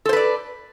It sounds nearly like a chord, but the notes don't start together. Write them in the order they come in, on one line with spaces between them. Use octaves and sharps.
A4 C5 B4 D5